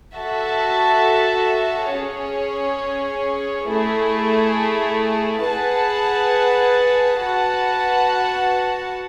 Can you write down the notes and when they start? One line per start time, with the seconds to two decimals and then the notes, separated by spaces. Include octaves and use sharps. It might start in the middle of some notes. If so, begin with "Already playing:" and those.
0.15 F#4 A4 E5 A5
1.91 C#4 G#4 C#5
3.67 A3 E4 G#4
5.43 G#4 B4 F#5 A5
7.19 F#4 B4 F#5 A5